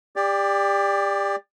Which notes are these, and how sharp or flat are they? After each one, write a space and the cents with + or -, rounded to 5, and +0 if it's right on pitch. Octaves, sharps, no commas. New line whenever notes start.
G4 +30 D5 +0